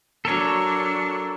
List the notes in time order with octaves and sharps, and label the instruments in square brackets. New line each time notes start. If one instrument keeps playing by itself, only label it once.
[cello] F#3 D4 [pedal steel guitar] A4 A#4 C#5